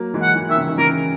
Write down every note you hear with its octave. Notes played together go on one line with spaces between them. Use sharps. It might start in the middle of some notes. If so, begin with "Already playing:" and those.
Already playing: F#3 A#3
E3 G#3
F#5
E3 G#3
D#3 E5
C#3 E3
D#3
C#3 E3 A#4